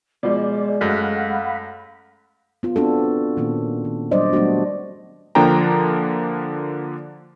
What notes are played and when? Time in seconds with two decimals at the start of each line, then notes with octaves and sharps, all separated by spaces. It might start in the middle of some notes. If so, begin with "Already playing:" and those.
0.23 B2 F3 G#3 D5
0.81 F#2 A3 F5 F#5 B5
2.63 B3 F4
2.76 B3 C4 D4 F#4 A4
3.37 A#2 D#3 A#3 C#4
3.85 D#3
4.11 F#3 G3 D4 C5 D5 D#5
4.33 F#3 G3 A3 B3 D4 F#4
5.35 D3 F3 A#3 D4 G5 A#5